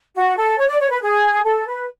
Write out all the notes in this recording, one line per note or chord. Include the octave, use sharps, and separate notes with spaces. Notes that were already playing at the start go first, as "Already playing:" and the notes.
F#4
A4
C#5
D5
C#5
B4
G#4
A4
B4